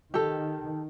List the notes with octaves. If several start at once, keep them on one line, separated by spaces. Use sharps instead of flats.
D#3 G4 A4